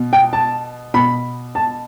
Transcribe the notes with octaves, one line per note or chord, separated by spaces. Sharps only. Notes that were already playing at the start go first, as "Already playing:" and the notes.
Already playing: B2
G5
A5
B2 B5
A5